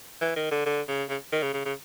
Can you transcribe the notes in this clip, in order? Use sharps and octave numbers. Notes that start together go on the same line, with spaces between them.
E3
D#3
D3
D3
C#3
C#3
D#3
C#3
C#3
C#3